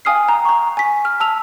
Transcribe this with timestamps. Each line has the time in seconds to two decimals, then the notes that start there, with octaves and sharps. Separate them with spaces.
0.05 F5 G5 G#5 D#6 F6 C7
0.29 A#5
0.45 A#5 C#6
0.77 G#5 B6
1.05 F6
1.20 A5 E6 F7